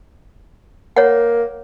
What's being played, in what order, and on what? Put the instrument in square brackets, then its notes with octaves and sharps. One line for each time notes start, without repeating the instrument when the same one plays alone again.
[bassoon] A#3 [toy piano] C#5 F#5